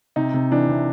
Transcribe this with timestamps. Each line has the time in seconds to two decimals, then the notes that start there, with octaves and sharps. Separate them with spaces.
0.16 C3 D#4
0.34 C3
0.51 E3 D4
0.69 C3